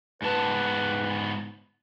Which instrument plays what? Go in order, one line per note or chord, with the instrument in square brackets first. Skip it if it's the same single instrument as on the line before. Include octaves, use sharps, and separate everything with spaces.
[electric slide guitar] G#2 B3 A5 [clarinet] B4